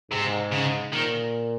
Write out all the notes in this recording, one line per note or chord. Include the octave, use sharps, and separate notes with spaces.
G#2 C3
C#3
A#2 D#3